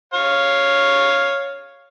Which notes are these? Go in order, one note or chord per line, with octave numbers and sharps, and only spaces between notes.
C#5 F5